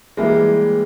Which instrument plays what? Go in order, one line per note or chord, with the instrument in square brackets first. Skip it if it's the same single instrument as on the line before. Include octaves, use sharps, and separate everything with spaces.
[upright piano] E3 G3 A#3 [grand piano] G#3